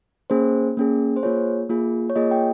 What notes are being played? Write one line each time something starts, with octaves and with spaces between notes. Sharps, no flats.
A#3 C#4 G#4 C5
A#3 C#4 G#4
C5
A#3 F4 G#4 C#5
A#3 F4 G#4
C#5
A#3 F4 G#4 D#5
G5